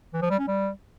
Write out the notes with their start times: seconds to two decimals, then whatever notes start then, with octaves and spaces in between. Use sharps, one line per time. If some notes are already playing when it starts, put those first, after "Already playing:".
0.14 E3
0.22 F3
0.31 G3
0.39 C#4
0.48 G3